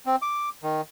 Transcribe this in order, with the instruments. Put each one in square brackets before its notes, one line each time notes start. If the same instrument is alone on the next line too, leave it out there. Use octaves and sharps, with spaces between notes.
[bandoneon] C4
D6
D#3